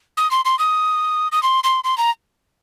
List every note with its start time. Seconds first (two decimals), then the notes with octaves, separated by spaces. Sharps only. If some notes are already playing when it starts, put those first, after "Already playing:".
0.17 D#6
0.31 C6
0.45 C6
0.59 D#6
1.32 D#6
1.43 C6
1.64 C6
1.84 C6
1.98 A#5